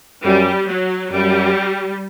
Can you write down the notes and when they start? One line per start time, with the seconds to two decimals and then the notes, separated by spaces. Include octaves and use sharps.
0.24 F#2 G3
0.69 F#3
1.12 F#2 G3